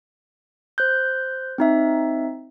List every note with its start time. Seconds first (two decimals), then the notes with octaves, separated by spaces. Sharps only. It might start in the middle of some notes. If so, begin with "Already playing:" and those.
0.78 C5 F#6 G6
1.58 C4 D#4 E5